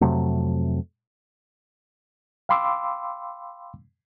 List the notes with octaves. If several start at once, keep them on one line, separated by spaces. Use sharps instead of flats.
F2 C3 F#3 A3
F5 G5 B5 C6 D6 E6